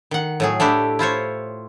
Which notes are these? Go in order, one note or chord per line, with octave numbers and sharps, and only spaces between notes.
D#3 F#5
A2 F#3 G#4
A3 D4 E4 G4
E4 F4 C5 C#5